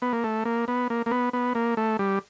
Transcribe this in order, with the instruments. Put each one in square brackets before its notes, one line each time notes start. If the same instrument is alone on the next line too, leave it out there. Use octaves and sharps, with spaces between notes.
[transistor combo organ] B3
A#3
A3
A#3
B3
A#3
A#3
B3
B3
A#3
A3
G3